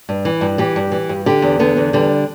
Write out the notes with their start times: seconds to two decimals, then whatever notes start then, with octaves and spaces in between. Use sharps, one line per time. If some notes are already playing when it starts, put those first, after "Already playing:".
0.09 G2
0.25 E3
0.41 G2
0.58 E3 G4
0.76 G2
0.92 E3
1.09 G2
1.26 D3 G4
1.42 E2
1.59 D3 B3
1.77 E2
1.93 D3 G3